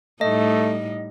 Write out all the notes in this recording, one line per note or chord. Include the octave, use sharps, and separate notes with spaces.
A2 G3 A3 D#4 D#5